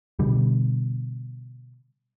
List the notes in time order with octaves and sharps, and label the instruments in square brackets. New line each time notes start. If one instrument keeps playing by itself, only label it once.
[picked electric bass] B2 D3 G3